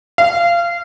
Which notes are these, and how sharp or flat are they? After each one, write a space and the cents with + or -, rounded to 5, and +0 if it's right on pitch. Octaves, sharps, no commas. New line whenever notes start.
F5 -25